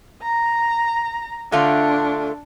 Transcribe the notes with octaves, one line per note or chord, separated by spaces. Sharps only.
A#5
D3 A3 D4 F4